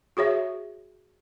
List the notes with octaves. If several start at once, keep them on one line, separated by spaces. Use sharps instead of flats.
F#4 G#4 C#5 E5